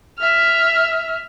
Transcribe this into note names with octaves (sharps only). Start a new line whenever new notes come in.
E5 F6